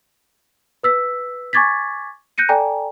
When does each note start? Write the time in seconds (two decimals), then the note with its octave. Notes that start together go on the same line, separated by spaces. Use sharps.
0.83 B4 E6 B6
1.53 G#5 C#6 D6 G#6 A6 B6
2.38 F#6 G6 A#6 C#7 D#7
2.49 A4 D5 G5 G#5 A#5